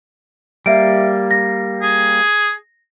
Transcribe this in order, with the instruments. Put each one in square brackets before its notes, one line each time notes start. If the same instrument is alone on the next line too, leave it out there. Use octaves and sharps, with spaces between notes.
[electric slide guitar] G3 A#3 [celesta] E5 D7
[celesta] A#6
[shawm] G#4